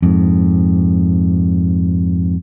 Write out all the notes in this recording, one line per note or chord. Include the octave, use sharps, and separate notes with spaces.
F2 G#2